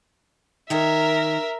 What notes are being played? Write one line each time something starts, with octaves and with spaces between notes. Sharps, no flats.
D#3 A#4 C#5 E5 A#5